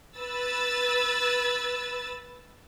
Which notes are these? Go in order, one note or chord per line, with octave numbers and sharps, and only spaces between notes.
B4 E6 A6